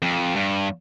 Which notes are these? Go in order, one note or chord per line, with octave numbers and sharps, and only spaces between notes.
F2
G2